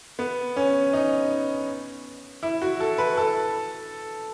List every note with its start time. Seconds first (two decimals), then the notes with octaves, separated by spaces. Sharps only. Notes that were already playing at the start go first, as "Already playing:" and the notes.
0.19 B3
0.56 C#4
0.93 D#4
2.43 E4
2.62 F#4
2.80 A4
2.98 B4
3.17 A4